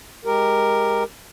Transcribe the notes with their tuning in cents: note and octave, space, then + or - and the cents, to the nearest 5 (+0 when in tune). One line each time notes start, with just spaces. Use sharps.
G#3 +0 G4 +10 A#4 +0